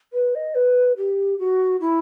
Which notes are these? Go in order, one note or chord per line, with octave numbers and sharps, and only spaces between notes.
B4
D#5
B4
G4
F#4
E4